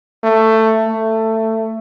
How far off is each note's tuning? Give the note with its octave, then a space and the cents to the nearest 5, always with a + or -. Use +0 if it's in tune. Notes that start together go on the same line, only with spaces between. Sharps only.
A3 +10
A3 +15